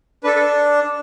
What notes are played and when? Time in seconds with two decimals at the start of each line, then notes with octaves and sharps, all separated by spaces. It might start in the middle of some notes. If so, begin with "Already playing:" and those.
0.24 D4 A4 B4
0.36 A4